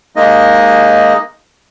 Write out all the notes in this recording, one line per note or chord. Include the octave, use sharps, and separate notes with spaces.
G#3 A#3 D#4 D#5